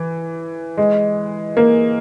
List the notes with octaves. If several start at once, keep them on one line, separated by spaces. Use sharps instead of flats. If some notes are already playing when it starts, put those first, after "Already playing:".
Already playing: E3
G#3
A#3